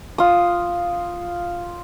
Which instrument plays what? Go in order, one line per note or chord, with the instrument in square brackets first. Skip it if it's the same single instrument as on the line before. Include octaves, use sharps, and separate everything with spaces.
[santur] F4 D#6